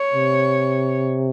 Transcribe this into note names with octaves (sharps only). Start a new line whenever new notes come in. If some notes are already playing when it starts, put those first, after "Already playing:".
Already playing: C#5
C3